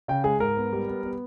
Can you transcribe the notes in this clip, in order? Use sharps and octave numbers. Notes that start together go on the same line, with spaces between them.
C#3 G5
G#3 G#4
G#2 A#4
B3
G3
B3
B3